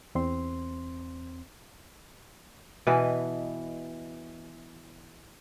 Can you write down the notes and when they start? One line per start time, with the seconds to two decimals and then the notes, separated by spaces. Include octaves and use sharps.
0.15 E2 C4 C6
2.87 B2 E3 B4 D#5